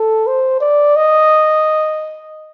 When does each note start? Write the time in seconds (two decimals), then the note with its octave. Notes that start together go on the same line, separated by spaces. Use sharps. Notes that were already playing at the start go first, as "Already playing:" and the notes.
Already playing: A4
0.27 C5
0.61 D5
0.96 D#5